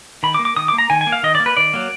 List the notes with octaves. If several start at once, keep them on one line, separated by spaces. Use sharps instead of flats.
D#3 B5
D6
A#3
D6
D#3 D#6
D6
A#3
A#5
D#3 G#5
G#5
A#3
F5
D#3 D#5
D5
A#3
B4
D#3 D5
F#3 A#3